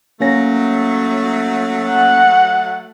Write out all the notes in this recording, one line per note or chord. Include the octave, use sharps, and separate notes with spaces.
F#3 A3 A#3 C#4 A#6
F#5